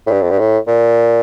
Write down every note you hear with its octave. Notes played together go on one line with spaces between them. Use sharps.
A2
G2
F2
G2
A2
A#2